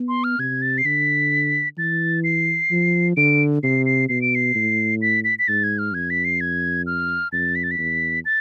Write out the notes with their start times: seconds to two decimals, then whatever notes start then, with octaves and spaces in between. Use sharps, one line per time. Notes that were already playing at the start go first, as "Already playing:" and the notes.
Already playing: B3
0.08 C6
0.24 F6
0.39 C3 G#6
0.62 A6
0.78 C7
0.85 D3 B6
1.78 E3 A6
2.24 C7
2.71 F3
3.17 D3 D7
3.63 C3 C7
3.86 C7
4.09 B2 C7
4.22 D7
4.35 C7
4.55 A2
5.02 B6
5.24 B6
5.39 B6
5.48 G#2 A6
5.64 G#6
5.79 F6
5.94 F2 G#6
6.10 B6
6.25 C7
6.41 G#6
6.87 F6
7.32 F2 A6
7.55 B6
7.64 A6
7.71 B6
7.79 E2
8.25 A6